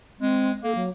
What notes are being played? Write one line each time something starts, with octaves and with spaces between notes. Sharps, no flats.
G#3 C4
A#3 A4
F#3